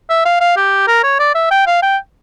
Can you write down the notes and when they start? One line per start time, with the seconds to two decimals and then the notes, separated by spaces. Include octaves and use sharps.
0.09 E5
0.25 F5
0.40 F5
0.57 G4
0.87 A#4
1.04 C#5
1.19 D5
1.35 E5
1.51 G5
1.67 F5
1.82 G5